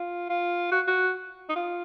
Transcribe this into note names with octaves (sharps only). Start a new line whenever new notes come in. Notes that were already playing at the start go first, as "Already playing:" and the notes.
Already playing: F4
F4
F#4
F#4
D#4
F4